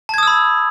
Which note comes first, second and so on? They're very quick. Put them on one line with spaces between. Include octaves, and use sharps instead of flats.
A5 G#6 D#6 E6 B5